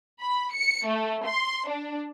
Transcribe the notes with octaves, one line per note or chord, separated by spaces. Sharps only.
B5
C#7
A3
C6
D4